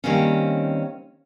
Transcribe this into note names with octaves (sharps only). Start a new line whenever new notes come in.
D#3 F3 G3 A#3 C4 C#4